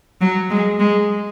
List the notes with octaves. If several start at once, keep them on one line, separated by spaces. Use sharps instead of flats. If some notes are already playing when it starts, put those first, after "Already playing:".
F#3
G#3
G#3